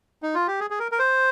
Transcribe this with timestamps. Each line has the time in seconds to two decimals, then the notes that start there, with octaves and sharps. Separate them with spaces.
0.23 D#4
0.35 F4
0.47 G4
0.60 G#4
0.70 G#4
0.79 A#4
0.92 A#4
0.99 C5